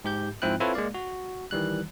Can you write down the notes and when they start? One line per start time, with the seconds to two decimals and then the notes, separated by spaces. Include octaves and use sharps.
0.04 G#2 G4 G6
0.42 G#2 F3 C4 E4 G5 F#6
0.60 C4 E4 F4 A4 B4 C#5
0.74 G#3 A#3 D5 F5
0.94 F#4
1.51 D#3 E3 G3 F#6